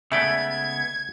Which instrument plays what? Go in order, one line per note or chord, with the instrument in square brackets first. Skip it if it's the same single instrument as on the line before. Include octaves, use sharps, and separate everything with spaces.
[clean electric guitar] C#3 G#3 B3 [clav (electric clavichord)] A3 D5 G5 [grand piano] E5 [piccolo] G#6